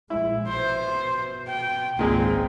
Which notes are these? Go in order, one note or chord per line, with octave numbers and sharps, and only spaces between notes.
A#1 G#3 E4
B2 C5
G5
G#1 C#2 A#2 G#3 C4